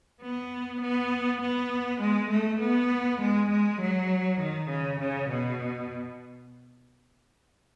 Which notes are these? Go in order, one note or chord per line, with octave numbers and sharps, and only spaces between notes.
B3
B3
B3
G#3
A3
B3
G#3
G#3
F#3
D#3
C#3
C#3
B2